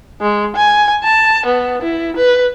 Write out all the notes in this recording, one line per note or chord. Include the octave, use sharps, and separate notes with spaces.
G#3
G#5
A5
B3
E4
B4